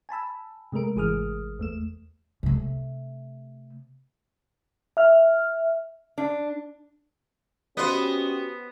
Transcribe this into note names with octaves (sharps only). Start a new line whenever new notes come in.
G#5 A5 B5 E6
C3 G#3 A3 A#4 D7
G#1 E3 G#4 D#6 F6
E2 A3 E7
C3 A3
E5 F6
D4
B3 C#4 F#4 G4 B4 C5 D#5